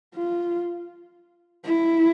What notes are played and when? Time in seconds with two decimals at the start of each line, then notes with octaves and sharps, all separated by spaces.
0.15 F4
1.65 E4